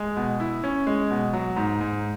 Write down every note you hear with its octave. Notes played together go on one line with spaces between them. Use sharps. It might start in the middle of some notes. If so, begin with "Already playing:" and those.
Already playing: G#3
B2
E4
C#4
G#3
B2
F#3
G#2
G#2